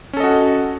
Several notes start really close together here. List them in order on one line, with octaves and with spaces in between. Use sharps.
C#4 A4 D#5 F#4